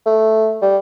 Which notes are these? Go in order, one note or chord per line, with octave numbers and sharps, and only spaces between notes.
A3
G3